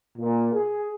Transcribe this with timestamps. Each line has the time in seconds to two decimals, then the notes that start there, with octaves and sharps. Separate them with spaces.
0.17 A#2
0.53 G#4